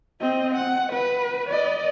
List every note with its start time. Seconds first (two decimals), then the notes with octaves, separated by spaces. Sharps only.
0.20 C4 D#5
0.55 F#5
0.92 B4
1.50 D5 D#5